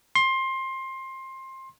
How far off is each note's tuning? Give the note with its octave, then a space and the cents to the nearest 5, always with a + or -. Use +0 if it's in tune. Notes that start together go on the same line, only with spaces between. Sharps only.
C6 +20